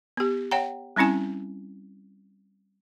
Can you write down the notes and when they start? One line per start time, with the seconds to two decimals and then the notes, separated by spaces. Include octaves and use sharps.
0.17 B3 G4
0.51 C#5 F#5 G5 A#5
0.96 G3 C4 C#4 E4 G#5